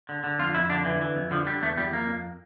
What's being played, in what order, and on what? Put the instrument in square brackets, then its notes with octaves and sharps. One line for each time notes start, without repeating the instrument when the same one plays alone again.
[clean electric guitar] D3
D3
F2 F4
F2 E4
D3 D4
D3 E3
E3
F2
D3 F3
D3 G3
E2 A3
E2 G3
F2 A#3
F2